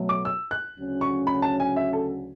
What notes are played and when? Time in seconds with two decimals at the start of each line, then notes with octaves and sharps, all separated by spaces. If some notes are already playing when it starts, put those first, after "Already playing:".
Already playing: B2 F#3 A3
0.09 D6
0.25 E6
0.51 F#6
0.76 D2 C#3 F#3 C#4 F#4
1.01 C#6
1.27 B5
1.42 A5
1.60 G#5
1.76 E5
1.93 A4